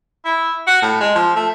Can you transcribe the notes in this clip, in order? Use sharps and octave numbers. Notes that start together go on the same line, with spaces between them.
E4
F#4
A2
G#3
F3
A3